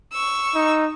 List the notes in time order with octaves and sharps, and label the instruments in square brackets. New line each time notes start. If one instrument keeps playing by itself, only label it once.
[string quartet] C#6 E6
[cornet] D#4